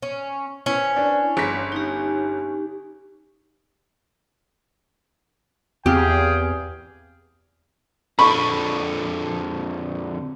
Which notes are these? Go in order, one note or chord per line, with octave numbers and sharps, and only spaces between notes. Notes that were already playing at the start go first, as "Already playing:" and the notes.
C#4
C#4 E4 B4 C5
D4
G1 C6 B6
D#4 G4
E2 C4 G4 G#4 F5 G5
F2 D3 B5 C#6